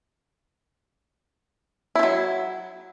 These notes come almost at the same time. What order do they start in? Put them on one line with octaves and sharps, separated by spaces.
E4 D#3 F#3